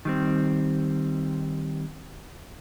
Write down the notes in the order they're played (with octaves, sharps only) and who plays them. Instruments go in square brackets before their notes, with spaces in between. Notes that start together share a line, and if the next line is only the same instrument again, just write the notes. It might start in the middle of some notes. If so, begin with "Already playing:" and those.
[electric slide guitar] D#3 G3 C4